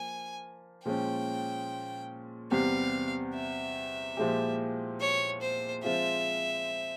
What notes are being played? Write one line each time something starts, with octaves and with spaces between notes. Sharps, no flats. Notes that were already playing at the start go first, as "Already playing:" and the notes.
Already playing: F3 A#3 G#5
A#2 F3 G#3 C#4 G5
E2 C3 G3 C4 G4 F5
E5
A#2 F3 G#3 E4 G4
C#5
C5
F3 G#3 C4 F4 E5